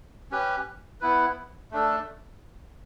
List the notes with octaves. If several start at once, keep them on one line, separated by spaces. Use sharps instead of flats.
C#4 G4 B4
B3 E4 B4
A3 D4 A4